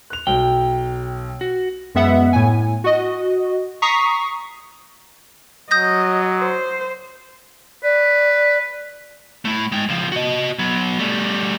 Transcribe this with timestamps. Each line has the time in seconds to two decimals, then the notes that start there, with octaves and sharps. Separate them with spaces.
0.10 F#6 F7
0.27 B1 G5
1.41 F#4
1.95 F#2 G#3 B3 E5 F#5
2.33 A2 G#5
2.84 F#4 D#5
3.82 A#5 C#6 D#6 B6 C7
5.71 F#3 D#5 D#6 G6 A#6
6.39 C5
7.83 B4 D5
9.45 A3 E4
9.72 G#3 G5
9.89 C#2 F3
10.12 F#4 D#5
10.59 F#3 B3
10.99 G3 A3